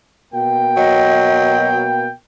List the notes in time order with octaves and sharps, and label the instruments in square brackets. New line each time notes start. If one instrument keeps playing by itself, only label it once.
[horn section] B2 A#3 G5
[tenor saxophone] F#3 [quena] D#5